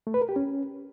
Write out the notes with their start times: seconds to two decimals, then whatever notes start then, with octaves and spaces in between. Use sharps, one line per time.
0.07 A3
0.14 B4
0.21 A#4
0.29 G4
0.36 C#4